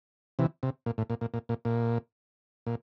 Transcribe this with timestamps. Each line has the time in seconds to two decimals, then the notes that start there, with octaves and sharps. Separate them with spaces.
0.39 C3 E3
0.63 C3
0.86 A#2
0.98 A2
1.10 A#2
1.21 A#2
1.34 A#2
1.49 A#2
1.65 A#2
2.66 A#2